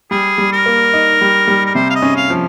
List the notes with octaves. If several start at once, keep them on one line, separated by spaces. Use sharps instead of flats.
G3 G#4
G3
A#4
A#3
D#4
G3
G3
A#4
C3 C5
F5
D#5
C#4
F5
F3